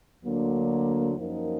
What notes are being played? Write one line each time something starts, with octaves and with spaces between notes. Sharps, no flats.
D2 D3 F#3 A#3
F#2 F3 A#3 D#4 A#4